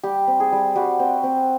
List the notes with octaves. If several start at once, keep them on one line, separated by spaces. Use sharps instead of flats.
G3 G4
C4
G#4
G3
G3 F#4
C4
C4